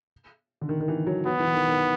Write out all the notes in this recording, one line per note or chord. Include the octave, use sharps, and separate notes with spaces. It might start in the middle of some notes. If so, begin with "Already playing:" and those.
D3
D#3
D#3
E3
F#3
F#3 B3
E3
D#3
D#3